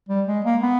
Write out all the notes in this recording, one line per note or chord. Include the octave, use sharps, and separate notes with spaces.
G3
G#3
A#3
B3